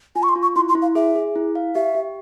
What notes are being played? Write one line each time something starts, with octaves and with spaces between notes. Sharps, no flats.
F4 G#5
C#6
C6
F4
C#6
E4 C6
C6
E4
F5
G#4 E5
G#4
E4
F5
G4 E5
G4